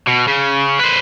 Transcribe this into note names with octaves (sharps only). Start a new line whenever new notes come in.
B2
C#3
B4 C5